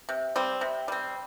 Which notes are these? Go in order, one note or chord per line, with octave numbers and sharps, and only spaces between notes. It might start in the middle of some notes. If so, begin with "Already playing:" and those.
C3
G3 C4
C3
G3 C4